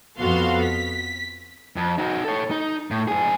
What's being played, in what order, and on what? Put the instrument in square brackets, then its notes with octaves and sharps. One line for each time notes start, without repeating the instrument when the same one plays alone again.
[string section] F2 B3 F#4 A4 F5 C6
B6
[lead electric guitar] F2
D#4 F#4
A4 C#5
D#4
A2
F#2 G#4